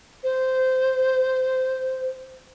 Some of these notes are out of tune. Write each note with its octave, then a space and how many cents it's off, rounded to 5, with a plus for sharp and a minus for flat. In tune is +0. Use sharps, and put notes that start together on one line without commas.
C5 -15